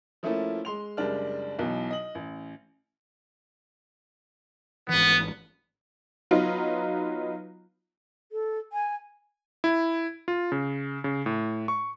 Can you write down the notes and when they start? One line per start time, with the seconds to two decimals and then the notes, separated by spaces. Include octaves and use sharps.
0.23 F3 A3 A#3 C#4 E4
0.65 G#3 C6 F7
0.97 F#1 G3 G#3 D4 F6
1.59 B1 B2 E3 F#3
1.91 D#5 F#7
2.15 A1
4.89 G#1 E3 B3
6.31 F#3 B3 D#4 F4
8.32 A4
8.73 G#5
9.64 E4
10.28 F4
10.52 C#3
11.04 C#3
11.26 A2
11.68 C#6